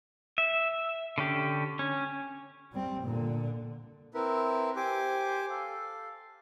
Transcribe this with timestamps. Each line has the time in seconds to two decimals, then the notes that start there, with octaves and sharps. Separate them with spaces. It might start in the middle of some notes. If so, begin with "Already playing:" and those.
0.38 E5
1.18 D3 C#4 G4
1.79 C#4
2.73 G3 C4
3.03 A#2 D3
4.14 C4 E4 A#4 B4 E5
4.76 G4 C5 G#5 D6
5.50 A4 F5